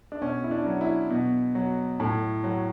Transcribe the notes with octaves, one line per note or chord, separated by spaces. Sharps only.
D4
B2 C#4
E4
D4
F#3
E4
B2
F#3
A2
F#3